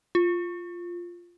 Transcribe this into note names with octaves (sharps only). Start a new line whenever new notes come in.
F4